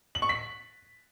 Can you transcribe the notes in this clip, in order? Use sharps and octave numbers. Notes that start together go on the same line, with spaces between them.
F#7
C#6
B6